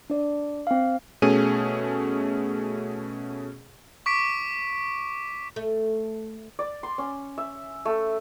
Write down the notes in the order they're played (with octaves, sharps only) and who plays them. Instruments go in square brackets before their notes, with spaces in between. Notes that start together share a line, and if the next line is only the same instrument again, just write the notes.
[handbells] D4 D5
C4 F5
[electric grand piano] B2 A3 C#4 G#4 D#7
[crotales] C#6 D6 B6 D7
[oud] A3
[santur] D5
C6
C#4
E5
A3